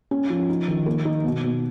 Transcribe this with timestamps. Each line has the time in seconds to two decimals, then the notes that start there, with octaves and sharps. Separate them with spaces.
0.11 C#4
0.30 F3
0.49 D#4
0.68 D#3
0.86 A#3
1.05 D#4
1.24 B2
1.44 B2